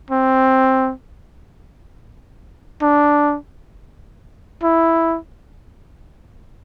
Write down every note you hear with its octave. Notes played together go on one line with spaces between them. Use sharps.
C4
D4
E4